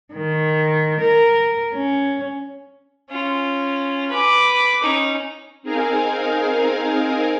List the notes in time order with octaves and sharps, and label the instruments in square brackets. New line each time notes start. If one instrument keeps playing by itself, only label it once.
[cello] D#3
A#4
C#4
[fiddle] C#4 F4
B4 D6
C#4 D#4
[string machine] C4 D#4 G#4 A#4 F5 G#5